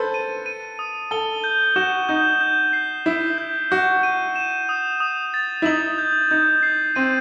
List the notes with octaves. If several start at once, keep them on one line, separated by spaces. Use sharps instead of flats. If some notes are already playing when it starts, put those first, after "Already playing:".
Already playing: A4 B4 C5 A6
D#7
D#7
D#6
A4 G7
G6
F#4 E7
D#4 G6
G6
C7
E4 G7
G6
F#4 G6
D#7
E7
D#6
D#6
A6
E4
D#4 F#7
G6
D#4 G6
C7
C4 D#7